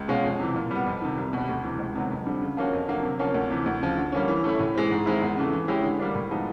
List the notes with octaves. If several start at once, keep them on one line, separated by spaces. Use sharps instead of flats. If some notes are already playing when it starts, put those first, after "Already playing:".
Already playing: C#2
B2 G#3 C#4 F4
F2
C3 E3
A#2
G3 B3
F2
C3 D#3
C2
B2 G3
D2
C3 E3
C#2
C3 D#3 F#3 B3
F2
D3 G3 C4
C#3
F3 A#3 C#4 F#4
F2
D3 F#3 A#3
C3
F3 A#3 C#4
D2
C3 E3
D2
C#3 F3
D3
G3 A#3 C#4
E3
A3 C#4 E4
A2
E3 G#3 C4
G#2
D#3 G#3 C4 E4
E2
C#3 E3 A3
E3
G#3 C#4 E4 G4
D3
G3 A#3 D4
A2
F3 G#3 B3 D#4